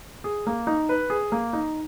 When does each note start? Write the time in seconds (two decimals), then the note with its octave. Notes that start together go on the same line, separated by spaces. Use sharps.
0.24 G#4
0.47 A#3
0.67 D#4
0.89 B4
1.10 G#4
1.32 A#3
1.53 D#4